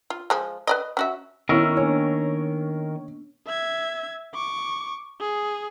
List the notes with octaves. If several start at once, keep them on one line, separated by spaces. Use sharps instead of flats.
F4
F3 G#3
B4 D5 D#5
C#4 F#4 E5
D#3 B3 C#4 E4 A#4 C#5 C#6 E6
A#3 D4 C#5 G#5
E5 G#6
C#6 D6
G#4